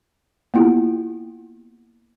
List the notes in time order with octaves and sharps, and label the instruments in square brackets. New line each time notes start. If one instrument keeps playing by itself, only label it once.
[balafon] A#3 B3 E4 F4 G4